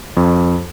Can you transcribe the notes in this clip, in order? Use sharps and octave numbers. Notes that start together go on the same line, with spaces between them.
F2